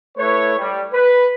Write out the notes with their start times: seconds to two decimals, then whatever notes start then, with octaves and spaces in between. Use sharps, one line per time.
0.18 A3 E4 B4 C#5
0.59 G3
0.93 B4